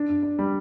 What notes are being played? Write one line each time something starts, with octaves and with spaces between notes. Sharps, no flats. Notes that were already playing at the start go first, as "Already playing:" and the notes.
Already playing: D4
G2
D4
G3